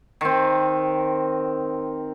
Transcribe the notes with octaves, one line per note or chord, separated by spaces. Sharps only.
D#3 C4